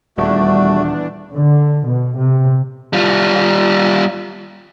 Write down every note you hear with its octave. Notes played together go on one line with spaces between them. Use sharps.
D#1 E2 G3 A3 D4 F#4
D3
B2
C3
G3 F4